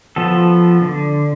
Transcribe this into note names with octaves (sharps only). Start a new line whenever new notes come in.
F3 B3 A4
D3